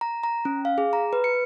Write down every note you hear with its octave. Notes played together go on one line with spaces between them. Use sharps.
A#5
A#5
C#4
F5
G#4
A#5
B4
C#7